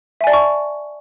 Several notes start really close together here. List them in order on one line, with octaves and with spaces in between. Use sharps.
E5 G#5 D5 A5 C#6